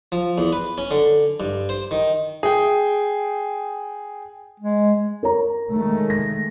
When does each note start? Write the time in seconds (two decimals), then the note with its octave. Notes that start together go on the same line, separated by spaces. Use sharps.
0.12 F3
0.38 E2
0.53 B4
0.78 C#4
0.91 D3
1.40 G2
1.69 C5
1.91 D#3
2.43 G#4 G5
4.60 G#3
5.23 A#4 C#5 A#5
5.73 D#3 G#3 A3
6.10 A#6